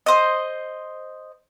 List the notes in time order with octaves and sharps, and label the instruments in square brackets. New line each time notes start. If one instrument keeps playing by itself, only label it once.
[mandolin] C5 D#5